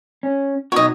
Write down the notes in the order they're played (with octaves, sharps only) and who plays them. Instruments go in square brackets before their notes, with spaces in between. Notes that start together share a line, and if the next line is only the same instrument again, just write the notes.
[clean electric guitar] C#4
[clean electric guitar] B2 D#4 F#4 [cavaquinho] C#5 D#5